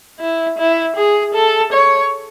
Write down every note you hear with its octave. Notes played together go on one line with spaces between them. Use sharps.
E4
E4
G#4
A4
C#5